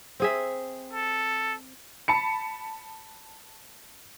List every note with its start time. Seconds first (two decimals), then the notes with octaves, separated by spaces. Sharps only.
0.20 C4 G#4 E5
0.93 A4
2.08 A5 B5 C#7